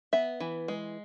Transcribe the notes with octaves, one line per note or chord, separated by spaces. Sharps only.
B3 E5
E3
G#3